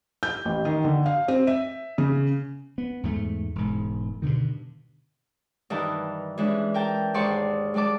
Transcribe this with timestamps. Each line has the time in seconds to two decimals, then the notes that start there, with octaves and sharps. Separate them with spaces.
0.23 G6
0.45 A1
0.65 D#3
0.84 D3
1.06 F5
1.28 C4
1.47 E5
1.98 C#3
2.78 B3
3.03 E2 G#2 A3
3.55 E1 G#2
4.22 G2 B2 D3 D#3
5.70 G2 D#3 E3 D#4 E4 A5
6.38 E3 G#3 C#4 D4
6.74 A#4 G5 A5
7.14 D#2 G#2 D5 A5 C6 C#6
7.74 G3 G#3 D5 A5 D6